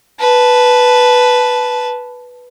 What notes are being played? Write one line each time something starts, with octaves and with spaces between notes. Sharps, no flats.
B4 A5